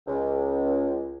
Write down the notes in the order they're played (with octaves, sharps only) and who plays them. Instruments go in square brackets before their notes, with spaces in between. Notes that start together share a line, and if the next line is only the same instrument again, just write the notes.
[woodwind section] C#2